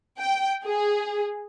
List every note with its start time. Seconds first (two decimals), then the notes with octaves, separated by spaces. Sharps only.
0.19 G5
0.63 G#4